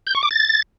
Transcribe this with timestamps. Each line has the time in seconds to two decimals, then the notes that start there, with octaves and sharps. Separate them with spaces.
0.07 G6
0.15 C#6
0.23 D6
0.31 A6